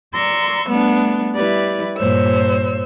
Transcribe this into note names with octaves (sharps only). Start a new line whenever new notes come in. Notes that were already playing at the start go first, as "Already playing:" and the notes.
D5 A#5 C6 C#6 E6
G3 A3 B3 D4
G3 E4 G4 B4 D5
G2 A#2 C5 C#5 E6